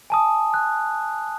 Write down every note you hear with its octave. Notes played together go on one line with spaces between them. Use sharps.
G#5 A5 D#6
F#6